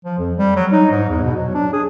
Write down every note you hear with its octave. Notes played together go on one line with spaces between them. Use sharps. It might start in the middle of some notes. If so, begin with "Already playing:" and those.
F3
F2
G3
F#3
D#4
G#2
E2
B2
F#3
D4
G#4